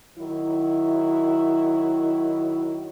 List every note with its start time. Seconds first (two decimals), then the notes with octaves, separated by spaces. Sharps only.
0.18 D#3 F#3 E4